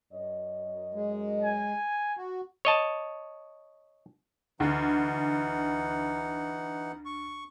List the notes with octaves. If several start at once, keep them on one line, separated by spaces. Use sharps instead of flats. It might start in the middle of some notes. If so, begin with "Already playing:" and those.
F#2 C#5 D#5
G#3
G#5
F#4
C#5 D#5 A5
D2 E3 D#4 F#5
C#6